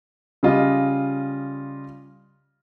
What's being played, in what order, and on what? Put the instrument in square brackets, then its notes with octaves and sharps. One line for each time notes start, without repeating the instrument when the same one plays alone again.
[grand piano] C#3 G3 F4 D#5